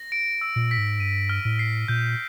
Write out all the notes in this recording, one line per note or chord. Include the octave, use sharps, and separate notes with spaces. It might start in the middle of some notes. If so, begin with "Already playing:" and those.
Already playing: A#6
D7
E6
A#2
B6
G#2
G2 D#7
F6
A2
C7
A#2 G6